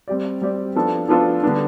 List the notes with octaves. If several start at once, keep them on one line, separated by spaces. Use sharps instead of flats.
G3 C4 G4 D5
G3 C4 G4 D5
F3 B3 D4 F4 A4
F3 B3 D4 F4 A4
D3 G3 B3 D4